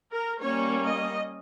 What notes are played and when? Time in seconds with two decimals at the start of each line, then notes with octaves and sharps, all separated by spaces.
0.11 A#4
0.41 G3 A#3 C#4 C#5
0.85 D#5